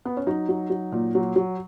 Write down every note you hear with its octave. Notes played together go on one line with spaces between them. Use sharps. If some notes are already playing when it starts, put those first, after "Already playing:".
B3
C#4
F#3 D#4
F#3
F#3
A#2
F#3
F#3